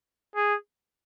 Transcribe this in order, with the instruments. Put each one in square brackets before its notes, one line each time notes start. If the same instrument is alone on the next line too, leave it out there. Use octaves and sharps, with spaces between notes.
[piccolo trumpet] G#4